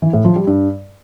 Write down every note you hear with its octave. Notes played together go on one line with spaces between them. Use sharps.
E3
A2
F3
G3
G2